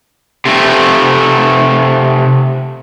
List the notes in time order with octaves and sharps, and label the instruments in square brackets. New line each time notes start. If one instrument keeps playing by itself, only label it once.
[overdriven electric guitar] C3 A3